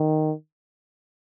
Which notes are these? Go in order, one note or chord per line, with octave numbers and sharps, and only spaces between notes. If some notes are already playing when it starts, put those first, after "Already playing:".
Already playing: D#3